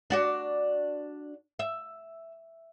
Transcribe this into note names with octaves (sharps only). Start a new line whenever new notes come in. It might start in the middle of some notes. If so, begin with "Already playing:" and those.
D4 F#4 D5
E5